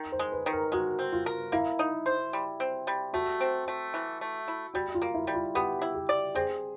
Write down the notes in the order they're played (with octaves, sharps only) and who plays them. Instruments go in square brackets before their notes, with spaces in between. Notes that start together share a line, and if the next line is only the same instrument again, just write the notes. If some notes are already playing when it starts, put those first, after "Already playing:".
Already playing: [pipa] D#3
[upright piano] C5
[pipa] G#3
[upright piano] B4
[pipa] D#3
[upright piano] A#4
[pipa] G#3 [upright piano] F#4
[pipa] C4
[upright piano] F4
[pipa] A#4
[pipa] A#3 [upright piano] E4
[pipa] D#4
C5
G3
C4
G3
[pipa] A3 [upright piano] F#4
[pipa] C4
A3
E3
A3
E4
[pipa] G3 [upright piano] F#4
[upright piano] F4
[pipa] A#3
[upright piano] E4
[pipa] G3
[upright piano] F4
[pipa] B3 [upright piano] G4
[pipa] E4
[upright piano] G4
[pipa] D5
[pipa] C4 [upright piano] G#4